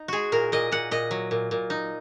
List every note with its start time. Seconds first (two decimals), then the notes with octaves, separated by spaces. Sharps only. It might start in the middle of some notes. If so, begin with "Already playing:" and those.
Already playing: D#4
0.08 G#3 F#4 G#4
0.32 A#2 A#4
0.52 A#2 D#5
0.72 A#2 F#5
0.91 A#2 D#5
1.11 F#3
1.31 A#2
1.51 A#2
1.70 D#4